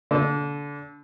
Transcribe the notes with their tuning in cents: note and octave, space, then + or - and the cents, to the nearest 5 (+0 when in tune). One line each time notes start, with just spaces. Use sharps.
D3 -30